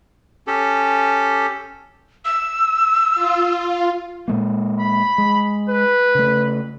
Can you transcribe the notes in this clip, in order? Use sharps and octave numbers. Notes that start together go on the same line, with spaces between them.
C#4 G4 A4
E6
F4
A#2 G#3 A#3
B5
G#3
B4
C#3 A3